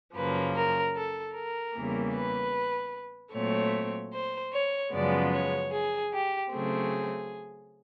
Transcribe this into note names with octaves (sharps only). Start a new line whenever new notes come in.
F#2 C#3 F3 A#3 B4
A#4
A4
A#4
E2 C#3 E3 G3 A#3
B4
A#2 F#3 A3 C4 C#5
C5
C#5
F#2 C#3 F3 G#3 B3 D5
C#5
G#4
G4
C#3 F#3 A3 C4 G#4